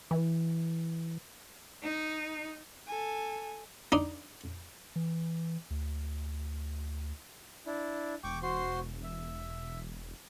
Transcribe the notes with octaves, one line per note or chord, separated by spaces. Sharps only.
E3
D#4
A4 G#5
D4 D#4
E3
D2
D4 E4
E1 G5 C#6 D6
F#4 C5 C6
E5